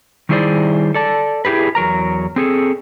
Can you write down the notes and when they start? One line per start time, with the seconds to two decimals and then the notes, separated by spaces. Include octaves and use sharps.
0.29 D#3 G3 E4 G#4 C5 D5
0.94 A4 D5 A5
1.45 E4 F4 G4 G#4 B4
1.75 E2 F#3 A#4 A#5
2.36 C4 G#4 A4